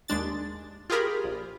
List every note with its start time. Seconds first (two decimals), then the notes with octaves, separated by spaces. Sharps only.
0.08 D#2 G#3 D4 A6
0.90 F4 G4 G#4 A#4 B5
1.24 A#1